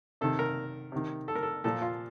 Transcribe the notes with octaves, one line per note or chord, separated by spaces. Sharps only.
C3 D#3 A4
A#4
C3 D#3
A4
A#4
A4
A#2 F3 A4
F4